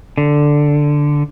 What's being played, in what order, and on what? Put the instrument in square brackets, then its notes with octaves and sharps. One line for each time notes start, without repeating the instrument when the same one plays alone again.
[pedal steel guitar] D3